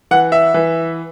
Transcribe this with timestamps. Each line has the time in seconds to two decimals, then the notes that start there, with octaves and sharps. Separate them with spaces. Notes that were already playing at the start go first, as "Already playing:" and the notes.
0.11 E3 F#5
0.32 E5
0.54 E3